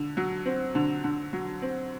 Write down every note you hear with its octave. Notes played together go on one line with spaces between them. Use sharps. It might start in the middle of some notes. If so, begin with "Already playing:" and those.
Already playing: D3
F#3
C4
D3
D3
F#3
C4